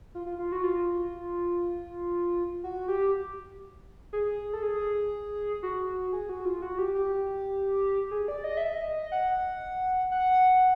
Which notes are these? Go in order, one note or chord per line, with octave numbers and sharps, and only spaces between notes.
F4
F4
F4
F#4
F4
F#4
G4
G#4
A4
G#4
F#4
G#4
F#4
F4
F#4
G4
G4
G#4
D5
D#5
E5
D#5
F#5
F#5